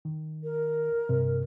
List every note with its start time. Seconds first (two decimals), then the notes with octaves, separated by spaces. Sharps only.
0.05 D#3
0.44 A#4
1.09 G2 C3